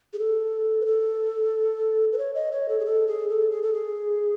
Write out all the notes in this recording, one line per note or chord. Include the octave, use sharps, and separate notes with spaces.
G#4
A4
B4
A4
B4
C#5
D#5
C#5
A4
G#4
A4
G#4
A4
G#4
A4
G#4